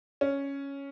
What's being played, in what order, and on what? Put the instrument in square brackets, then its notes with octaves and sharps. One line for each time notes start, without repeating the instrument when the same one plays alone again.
[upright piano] C#4